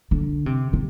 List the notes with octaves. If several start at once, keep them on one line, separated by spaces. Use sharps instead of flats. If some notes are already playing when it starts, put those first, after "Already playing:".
D3
C3
C3